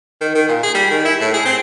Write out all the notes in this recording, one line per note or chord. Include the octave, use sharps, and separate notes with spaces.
D#3
D#3
A#2
G#4
G3
D#3
E4
A2
G#4
C4